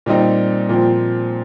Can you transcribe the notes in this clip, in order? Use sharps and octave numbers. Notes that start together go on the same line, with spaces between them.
A#2 G3 C4 D#4
A#2 F3 C4